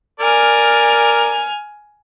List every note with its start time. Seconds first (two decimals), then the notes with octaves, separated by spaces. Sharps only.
0.20 A#4 D5 G#5 F6